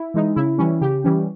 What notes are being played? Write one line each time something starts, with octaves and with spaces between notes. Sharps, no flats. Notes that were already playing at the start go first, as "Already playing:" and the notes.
Already playing: E4
E3 G#3 D#4
C#3 E4
E3 G3 C#4
C#3 G4
E3 G3 C#4